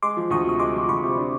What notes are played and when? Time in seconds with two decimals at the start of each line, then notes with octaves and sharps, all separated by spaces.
0.03 G#3 C6 D6
0.17 F3
0.30 D2 C#6 D#6
0.46 C3 D#6
0.59 G#3 C6 D6
0.75 F3
0.89 D2 B5 C#6
1.03 C3
1.17 D4